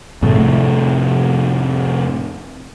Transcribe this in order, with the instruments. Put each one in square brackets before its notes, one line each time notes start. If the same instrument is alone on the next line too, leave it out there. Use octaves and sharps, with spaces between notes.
[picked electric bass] F2 A2 C3 A3